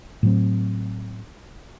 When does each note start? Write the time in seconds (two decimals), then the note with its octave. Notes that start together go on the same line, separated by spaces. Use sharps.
0.23 A2 F#3 C4